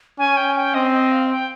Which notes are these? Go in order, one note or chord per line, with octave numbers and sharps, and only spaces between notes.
C#4 G#5
G5
G5
C4 D#5
D#5
F5
G5